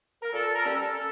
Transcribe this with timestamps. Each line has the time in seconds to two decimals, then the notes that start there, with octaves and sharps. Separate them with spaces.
0.22 A#4
0.32 A#2 A4
0.56 A#4
0.64 G3 A#3 C#4 A4